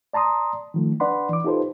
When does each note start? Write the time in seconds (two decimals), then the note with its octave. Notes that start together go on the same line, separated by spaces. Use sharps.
0.13 D5 A5 A#5 C6 D#6
0.74 D#3 F3 A3
1.00 D4 B4 D5 F#5 B5 C6
1.29 E3 D6
1.44 D#4 F4 G4 A4 B4 C5